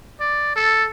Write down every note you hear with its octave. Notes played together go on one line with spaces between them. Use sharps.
D5
A4